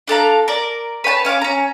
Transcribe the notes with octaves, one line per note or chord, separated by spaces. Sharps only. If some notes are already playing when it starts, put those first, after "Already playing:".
D4 A4 F5 A#5
A#4 D5
B4 C#5 G5 A5
C#4 F5 G#5 D6
C#4 A#5